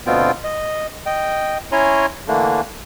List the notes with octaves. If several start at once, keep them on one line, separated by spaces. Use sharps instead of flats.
D2 B2 B3 C4 F4 G5
D#5
D#5 G5
C#4 E4 C#5 G#5 A#5 C6
D3 E3 A3 A#3 D4